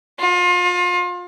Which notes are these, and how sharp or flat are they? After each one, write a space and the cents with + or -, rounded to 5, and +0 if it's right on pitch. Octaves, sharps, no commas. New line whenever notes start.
F4 +30